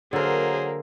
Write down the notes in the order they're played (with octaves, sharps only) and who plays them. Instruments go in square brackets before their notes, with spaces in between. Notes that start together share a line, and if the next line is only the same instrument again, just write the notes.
[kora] D3 A#4 [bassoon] F#3 [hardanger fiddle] A#3 [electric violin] G#4 C5